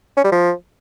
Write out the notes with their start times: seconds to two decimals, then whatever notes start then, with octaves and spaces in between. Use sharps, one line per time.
0.17 C#4
0.24 G3
0.32 F3